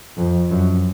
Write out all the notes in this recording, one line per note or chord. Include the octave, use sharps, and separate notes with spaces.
F2
F#2